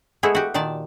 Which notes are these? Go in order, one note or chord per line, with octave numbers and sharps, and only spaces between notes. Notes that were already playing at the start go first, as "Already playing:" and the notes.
G#3 A3 B3 E4 G#4
F#4 G4
A#2 D#3 D5 A5